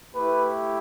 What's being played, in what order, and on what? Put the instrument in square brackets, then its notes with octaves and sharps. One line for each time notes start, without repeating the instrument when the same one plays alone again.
[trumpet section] A3 E4 G4 B4